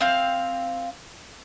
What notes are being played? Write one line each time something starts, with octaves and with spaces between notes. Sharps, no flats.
C4 F5